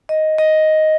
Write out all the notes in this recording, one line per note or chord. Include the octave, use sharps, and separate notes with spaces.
D#5
D#5